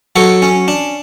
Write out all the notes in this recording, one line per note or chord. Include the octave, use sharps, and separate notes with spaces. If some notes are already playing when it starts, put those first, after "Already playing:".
F#3 A4 C#5
C#4
D4